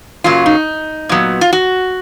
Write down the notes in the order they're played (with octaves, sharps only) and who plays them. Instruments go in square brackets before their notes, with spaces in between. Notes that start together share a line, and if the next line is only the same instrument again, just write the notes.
[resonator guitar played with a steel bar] F#2 C#3 F#3 A#3 F4
D#4
A#2 F#3 B3
F4
F#4